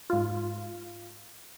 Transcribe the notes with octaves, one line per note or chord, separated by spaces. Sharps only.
G#2 F4